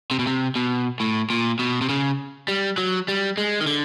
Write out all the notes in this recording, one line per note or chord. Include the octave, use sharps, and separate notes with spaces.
C3
B2
C3
B2
A2
A#2
B2
C3
C#3
G3
F#3
G3
G#3
D#3
D3